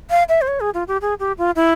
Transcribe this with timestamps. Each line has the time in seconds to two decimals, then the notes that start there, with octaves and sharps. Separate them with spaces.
0.11 F5
0.29 E5
0.41 C5
0.48 C#5
0.60 G#4
0.74 F4
0.88 G4
1.01 G#4
1.20 G4
1.38 F4
1.56 E4